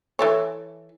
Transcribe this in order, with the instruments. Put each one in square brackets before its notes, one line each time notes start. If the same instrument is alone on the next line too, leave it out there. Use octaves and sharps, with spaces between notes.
[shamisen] E3 A4 C#5